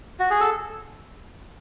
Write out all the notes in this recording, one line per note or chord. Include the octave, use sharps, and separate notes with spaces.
F#4
G#4
A4